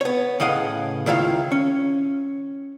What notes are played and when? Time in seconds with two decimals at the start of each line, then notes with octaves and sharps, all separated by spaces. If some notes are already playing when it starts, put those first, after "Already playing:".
0.01 B3 C#5
0.40 A2 C#3 D#5 F5 F#5
1.06 C#2 D#3 E4 F4 F5
1.52 C#4